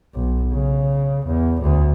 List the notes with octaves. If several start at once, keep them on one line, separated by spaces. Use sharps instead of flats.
B1
C#3
E2
D2